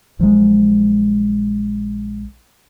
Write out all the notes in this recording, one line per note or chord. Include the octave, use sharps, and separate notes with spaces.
A#1 F3 F#3 G#3